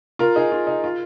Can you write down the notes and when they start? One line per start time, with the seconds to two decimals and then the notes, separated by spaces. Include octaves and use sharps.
0.19 F4 A#4
0.36 D#4 G#4
0.52 F4
0.67 D#4
0.84 F4